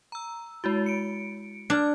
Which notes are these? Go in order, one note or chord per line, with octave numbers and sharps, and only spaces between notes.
A#5 E6
G#3 E4 F#4
C#7 D7
D4 F6 G#6